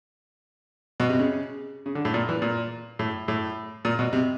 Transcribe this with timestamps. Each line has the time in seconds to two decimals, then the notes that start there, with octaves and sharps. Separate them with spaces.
1.00 B2
1.09 C3
1.19 C#3
1.86 C#3
1.95 D3
2.05 A2
2.14 A#2
2.29 E3
2.42 A#2
2.99 A2
3.28 A2
3.85 A#2
3.99 B2
4.13 C3